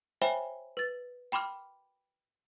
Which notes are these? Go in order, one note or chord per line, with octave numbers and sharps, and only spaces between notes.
C5 C#5 E5 G5 G#5 B5
B4 A6
G5 B5 C6 D6 F6